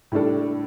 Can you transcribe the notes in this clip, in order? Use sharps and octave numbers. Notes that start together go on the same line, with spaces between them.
A2 G3 D4 A4